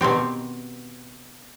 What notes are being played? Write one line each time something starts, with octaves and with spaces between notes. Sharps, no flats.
B2 D#3 C4 G4